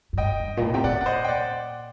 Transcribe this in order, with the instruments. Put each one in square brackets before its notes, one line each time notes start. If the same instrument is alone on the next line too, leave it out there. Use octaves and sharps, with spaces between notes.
[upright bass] G2
[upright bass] F#2 [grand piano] D#5 G5
[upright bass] G2
A#2
A2
[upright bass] C3 [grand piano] G5
[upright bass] A#2 [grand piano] D5 F#5
[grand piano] F#5
C5 D#5
G5
D5 F#5